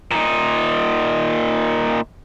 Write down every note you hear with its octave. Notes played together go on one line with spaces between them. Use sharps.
A#2 D#4